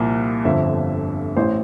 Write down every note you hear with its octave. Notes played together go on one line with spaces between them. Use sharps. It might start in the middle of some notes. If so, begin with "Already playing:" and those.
Already playing: C2 A#2 F3
G1 F2 D3 F3 E5
A1 A2 E3 C5